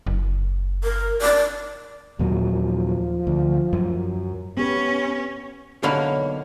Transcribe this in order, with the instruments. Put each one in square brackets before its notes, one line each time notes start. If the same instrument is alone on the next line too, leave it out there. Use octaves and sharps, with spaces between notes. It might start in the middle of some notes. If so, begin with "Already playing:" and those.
[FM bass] F#1
[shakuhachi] A#4
D5
[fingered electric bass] D#2 A#2 F#3 [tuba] F3
[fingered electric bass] D2
F#2
[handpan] B3 G4 B4 [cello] C#4
[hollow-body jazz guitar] B1 C#5 B5 [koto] D3 A#3 F5